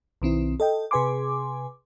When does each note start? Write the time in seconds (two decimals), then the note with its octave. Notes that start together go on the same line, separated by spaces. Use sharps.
0.22 B1 D#3 C4 E4
0.60 A4 D#5 G5
0.91 C3 G#4 B4 G#5 C6 D6